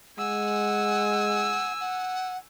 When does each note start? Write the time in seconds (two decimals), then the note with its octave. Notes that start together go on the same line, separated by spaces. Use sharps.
0.18 G#3 F#5 G#5 E6
1.80 F#5